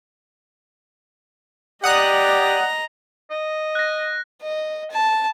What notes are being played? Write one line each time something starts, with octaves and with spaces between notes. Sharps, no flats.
G4 D5 D#5 F#5 A#5 D#6 F#6
D#5
F#6 A#6
D#5
A5